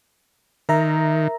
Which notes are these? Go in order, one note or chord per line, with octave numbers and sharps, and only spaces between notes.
D#3 A#4 E5 A#5